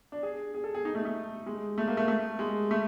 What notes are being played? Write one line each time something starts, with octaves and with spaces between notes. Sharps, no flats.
D4
G#4
G#4
A4
G#4
D#4
A3
A3
G#3
A3
A#3
A3
A3
G#3
A3